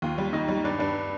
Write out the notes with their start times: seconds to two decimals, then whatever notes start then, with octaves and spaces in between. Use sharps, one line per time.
0.02 D#2 F4
0.18 G3
0.33 D#2 D#4
0.48 G3
0.64 G2 D4
0.79 G2 D4